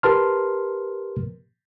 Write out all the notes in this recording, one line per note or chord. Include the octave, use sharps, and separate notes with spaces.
G4 A#4 B4 A5 C6 F6